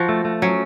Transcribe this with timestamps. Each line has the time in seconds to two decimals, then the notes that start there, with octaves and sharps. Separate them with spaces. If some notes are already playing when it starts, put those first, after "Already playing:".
Already playing: F3 F#4
0.09 A3
0.25 A3
0.42 F#3 C#4